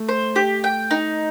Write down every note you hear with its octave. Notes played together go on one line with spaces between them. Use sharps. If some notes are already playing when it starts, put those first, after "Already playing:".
Already playing: A3
C5
G4
G5
D#4